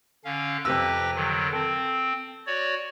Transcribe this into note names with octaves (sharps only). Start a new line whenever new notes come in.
D3 C#4 F5
F2 C3 G4 B4 E6 A#6
D3 D#3 F#3
C4 A4
F#4 C#5 D5